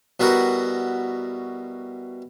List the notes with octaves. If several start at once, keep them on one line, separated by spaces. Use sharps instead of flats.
B2 G3 E4 F#4 A#4